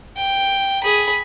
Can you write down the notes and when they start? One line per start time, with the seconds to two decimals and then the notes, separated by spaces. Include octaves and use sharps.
0.17 G5
0.83 G#4 B5